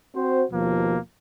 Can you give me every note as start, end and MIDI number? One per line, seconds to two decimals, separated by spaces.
0.16 0.44 60
0.16 0.44 66
0.16 0.44 72
0.52 0.98 39
0.52 0.98 47
0.52 0.98 53
0.52 0.98 58